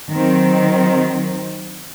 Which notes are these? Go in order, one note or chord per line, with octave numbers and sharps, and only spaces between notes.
D#3 F#3 C4